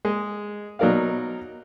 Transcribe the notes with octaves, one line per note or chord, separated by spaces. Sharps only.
G#3
B2 F#3 D#4 A#4 D5 F5